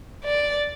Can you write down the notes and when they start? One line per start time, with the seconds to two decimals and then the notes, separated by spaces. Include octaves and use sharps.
0.24 D5